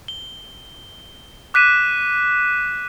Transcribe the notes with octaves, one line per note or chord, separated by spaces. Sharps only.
G7
D6 F#6 B6 D#7 E7